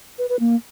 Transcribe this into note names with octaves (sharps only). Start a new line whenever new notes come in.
B4
B4
A#3